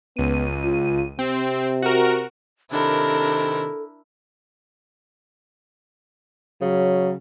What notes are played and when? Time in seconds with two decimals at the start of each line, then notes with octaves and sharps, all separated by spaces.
0.17 C#2 B3 D#7
0.64 F4
1.19 C3 C4
1.82 F#4 A#4
2.71 C3 D#3 D4 E4 A4 A#4
6.61 C#3 F#3